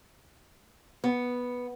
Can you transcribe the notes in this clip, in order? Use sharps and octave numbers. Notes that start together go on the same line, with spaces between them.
B3